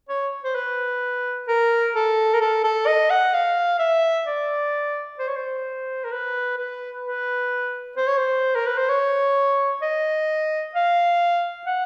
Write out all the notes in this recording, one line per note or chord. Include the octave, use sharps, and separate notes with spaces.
C#5
C5
B4
A#4
A4
A#4
A4
A4
D#5
F#5
F5
E5
D5
C5
C#5
C5
A#4
B4
B4
B4
C5
C#5
C5
A#4
B4
C5
C#5
D#5
F5
F#5